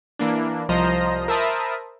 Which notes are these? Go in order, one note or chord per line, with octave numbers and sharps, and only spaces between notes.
E3 A#3 D4
C2 F3 C5 D#5 A#5 A#6
A#4 C5 E5 A5 B5 D#6